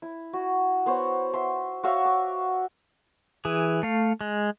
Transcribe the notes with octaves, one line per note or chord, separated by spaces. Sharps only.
E4
F#4
B3 C5 C#5
E5 C6
F#4 C#5 E5 F5
D6
E3 G#4
A3 F5
G#3